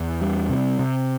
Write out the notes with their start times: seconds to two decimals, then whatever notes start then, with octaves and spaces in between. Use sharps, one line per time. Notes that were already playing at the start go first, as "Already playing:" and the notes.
Already playing: E2
0.21 G3
0.49 C3
0.79 C3